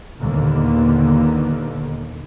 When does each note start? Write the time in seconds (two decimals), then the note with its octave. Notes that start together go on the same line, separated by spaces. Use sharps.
0.19 D#2 A#2 D3 A#3 B3